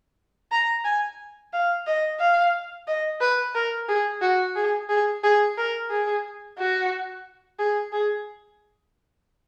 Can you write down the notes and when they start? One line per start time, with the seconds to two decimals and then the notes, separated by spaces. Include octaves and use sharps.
0.52 A#5
0.84 G#5
1.52 F5
1.86 D#5
2.20 F5
2.87 D#5
3.21 B4
3.55 A#4
3.89 G#4
4.22 F#4
4.55 G#4
4.89 G#4
5.23 G#4
5.57 A#4
5.90 G#4
6.58 F#4
7.59 G#4
7.92 G#4